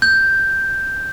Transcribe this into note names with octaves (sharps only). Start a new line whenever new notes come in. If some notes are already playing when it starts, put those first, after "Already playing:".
G6